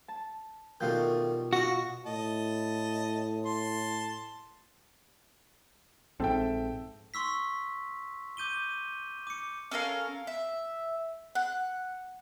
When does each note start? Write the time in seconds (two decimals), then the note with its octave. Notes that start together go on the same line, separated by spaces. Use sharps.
0.08 A5
0.80 B2 D#3 G3 A3 F4 G6
1.53 F#4 D#5 F5
2.06 A2 D#5 A5
3.46 A5 C6
6.20 A#1 G#2 C4 A4 E5 G5
7.14 C6 C#6 E6 B6
8.37 D6 G6 D#7 G7
9.27 D6 C#7
9.71 C#4 A4 A#4 F5
10.27 E5
11.35 F#5